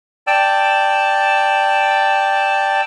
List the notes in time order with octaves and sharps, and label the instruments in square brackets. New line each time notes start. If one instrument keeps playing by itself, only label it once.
[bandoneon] D5 G5 A5 E6